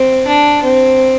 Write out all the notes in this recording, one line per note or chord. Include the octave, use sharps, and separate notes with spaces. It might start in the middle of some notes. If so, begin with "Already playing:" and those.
Already playing: C4
D4
C4